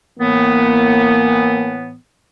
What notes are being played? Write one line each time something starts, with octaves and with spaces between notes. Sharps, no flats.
A2 E3 A#3 B3